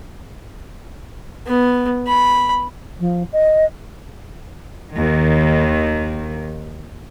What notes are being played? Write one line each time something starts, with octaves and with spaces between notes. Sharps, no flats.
B3
B5
F3
D#5
D#2 D#3